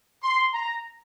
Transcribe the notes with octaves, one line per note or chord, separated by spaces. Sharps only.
C6
A#5